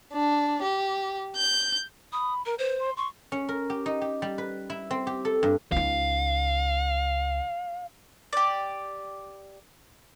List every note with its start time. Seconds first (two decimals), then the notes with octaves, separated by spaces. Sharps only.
0.12 D4
0.62 G4
1.36 G6
2.13 B5 D#6
2.46 A#4 A#5
2.59 B4 C5
2.80 C6
2.97 C6 C#6
3.32 C#4
3.49 A#4
3.70 G4
3.86 D#4
4.01 G4
4.22 G3
4.38 B4
4.70 E4
4.91 C4
5.07 G4
5.25 A4
5.43 G2
5.72 C#2 D#4 F5
8.33 G4 D5